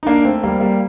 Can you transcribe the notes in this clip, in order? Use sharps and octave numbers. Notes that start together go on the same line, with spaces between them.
D#4
A#3 D4
A3 C4
G3 A#3
G3 A#3